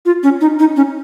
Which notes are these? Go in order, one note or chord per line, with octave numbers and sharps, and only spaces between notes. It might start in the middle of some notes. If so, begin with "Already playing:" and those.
F4
C#4
D#4
D#4
C#4